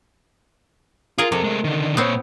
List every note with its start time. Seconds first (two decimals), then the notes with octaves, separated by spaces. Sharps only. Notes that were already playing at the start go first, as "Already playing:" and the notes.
1.18 F4 G#4 A#4
1.32 F2 C3 A4
1.44 G#3 A3
1.64 D3 D#3
1.97 A#2 B3 C4 C#5